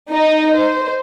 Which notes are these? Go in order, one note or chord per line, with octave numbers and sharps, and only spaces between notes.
D#4 D#5
C5